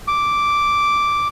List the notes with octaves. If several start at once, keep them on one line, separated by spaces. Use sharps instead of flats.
D6